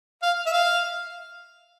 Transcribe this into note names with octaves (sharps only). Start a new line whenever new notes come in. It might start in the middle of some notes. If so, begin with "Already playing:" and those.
F5
E5
F5